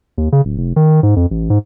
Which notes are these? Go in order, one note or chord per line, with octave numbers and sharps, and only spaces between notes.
D#2
C#3
D1
F1
D#3
G#2
F2
A1
G#2